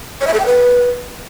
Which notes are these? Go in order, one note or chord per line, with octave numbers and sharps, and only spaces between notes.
C#5
E5
A4
G5
B4